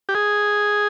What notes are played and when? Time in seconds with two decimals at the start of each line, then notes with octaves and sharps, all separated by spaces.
0.09 G4
0.15 G#4